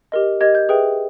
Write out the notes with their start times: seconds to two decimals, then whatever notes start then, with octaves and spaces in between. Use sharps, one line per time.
0.12 G4 A#4 D#5
0.40 G4 A#4 D#5 G#6
0.55 G6
0.69 G#4 B4 E5 G5